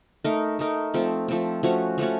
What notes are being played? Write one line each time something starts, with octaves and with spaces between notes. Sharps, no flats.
A3 D#4 A#4
A3 D#4 A#4
F3 A3 C4
F3 A3 C4
F3 A3 C#4 F#4
F3 A3 C#4 F#4